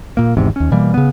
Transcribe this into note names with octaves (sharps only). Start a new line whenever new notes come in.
A#2 A#3
G#1 E2 G#2 C3
D#2 C#4
B2 E3 G3 A#3
C#3 B3